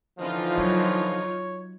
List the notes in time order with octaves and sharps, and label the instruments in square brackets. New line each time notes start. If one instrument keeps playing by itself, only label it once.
[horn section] D3 E3 F3 [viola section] D#4 F4 [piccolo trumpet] F5
[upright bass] F#3 [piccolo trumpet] C#5